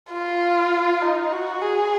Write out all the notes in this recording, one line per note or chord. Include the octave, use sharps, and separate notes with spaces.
F4
D#4
F#4
G#4